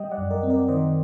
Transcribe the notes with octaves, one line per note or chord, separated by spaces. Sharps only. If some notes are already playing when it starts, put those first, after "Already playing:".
Already playing: G3 D#5 G5
D5 F#5
F#2
A#4 D5
C4
A#4 D5
D#3 C5 D#5